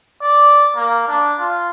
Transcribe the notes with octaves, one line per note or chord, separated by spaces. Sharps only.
D5
A#3
D4
F4